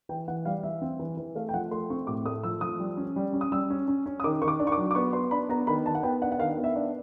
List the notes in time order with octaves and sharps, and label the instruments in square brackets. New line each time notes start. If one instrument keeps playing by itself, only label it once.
[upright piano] E3 G5
E3 F#5
G3 F5
E3 E5
C4
E3
E3
A3 F5
G5
F3 F#5
A3 C6
C4 C#6
A2 D6
A3 D#6
F3 E6
F3 D#6
G3
C#4
G3
C#4
D#6
G3 E6
C#4
C#4
C#4
D#6
D#3 D6
D#3 C#6
D6
D4
C#6
D6
F#3
D6
B3 C#6
B3 C6
D4 B5
B3 A#5
D#3 B5
D#3 A5
F#5
B3 G5
D4 F#5
F#5
D#3 F5
B3
E5
D4